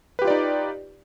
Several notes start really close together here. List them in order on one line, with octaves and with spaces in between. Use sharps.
B4 G4 F4 D5 D#4